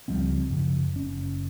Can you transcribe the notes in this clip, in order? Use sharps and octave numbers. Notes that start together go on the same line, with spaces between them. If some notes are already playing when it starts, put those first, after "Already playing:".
C#2 F3 G3 C4
F#2 C#3 F3
F#1 C#4